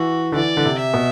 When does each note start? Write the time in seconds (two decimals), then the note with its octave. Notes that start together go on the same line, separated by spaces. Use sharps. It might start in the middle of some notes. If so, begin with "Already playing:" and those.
Already playing: E3 F#4
0.32 D3
0.36 E3 D5
0.57 D3
0.65 C3
0.79 E5
0.94 B2